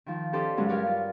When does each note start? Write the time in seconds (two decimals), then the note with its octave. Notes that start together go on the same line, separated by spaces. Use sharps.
0.06 D#3 F3
0.33 C#4 G4 A4 C5 D5 D#5
0.57 G2 C#3 F#3 G#3 C#4 F#4
0.69 F4 G4 A#4 C#5 D5 F5
0.87 F4